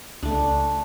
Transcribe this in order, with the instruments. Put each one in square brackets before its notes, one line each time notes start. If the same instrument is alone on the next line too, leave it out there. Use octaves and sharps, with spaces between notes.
[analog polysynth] C#2 [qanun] A3 D4